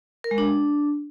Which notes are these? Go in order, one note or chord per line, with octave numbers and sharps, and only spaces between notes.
A#4
G#3
D4